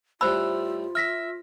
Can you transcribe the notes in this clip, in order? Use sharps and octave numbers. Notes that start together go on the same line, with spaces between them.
A2 G3 A3 F4 C5 B5 E6
E5 F6 A#6 B6